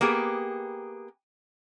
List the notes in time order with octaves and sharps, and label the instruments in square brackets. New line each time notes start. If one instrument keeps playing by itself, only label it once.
[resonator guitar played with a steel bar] A#3 B3 G4 G#4